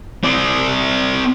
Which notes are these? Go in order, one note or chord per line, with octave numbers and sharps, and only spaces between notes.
C4 D5